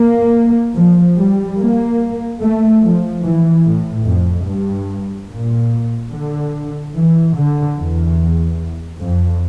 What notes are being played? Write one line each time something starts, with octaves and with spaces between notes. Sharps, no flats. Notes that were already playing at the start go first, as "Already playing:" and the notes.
Already playing: A#3
F3
G3
A#3
A3
F3
E3
A2
F2
G2
A#2
D3
E3
D3
E2
F2